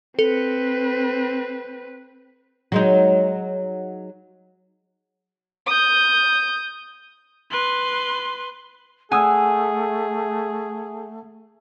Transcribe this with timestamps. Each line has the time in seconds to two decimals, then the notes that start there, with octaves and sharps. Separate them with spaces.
0.19 C4 A4 B4
2.72 F#3 G#3 D#4
5.66 D#6 G6
7.51 B4 C6
9.12 A3 G#4 F#5 G#5 D#6 E6